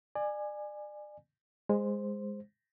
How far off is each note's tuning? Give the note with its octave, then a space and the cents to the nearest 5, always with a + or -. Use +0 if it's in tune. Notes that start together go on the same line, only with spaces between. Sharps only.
D5 +35 G#5 -5
G#3 -15 C5 +0